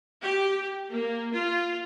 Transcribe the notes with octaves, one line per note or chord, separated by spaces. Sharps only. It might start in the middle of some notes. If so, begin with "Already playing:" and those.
G4
A#3
F4